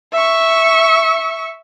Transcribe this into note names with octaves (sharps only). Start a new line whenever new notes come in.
E5 C#6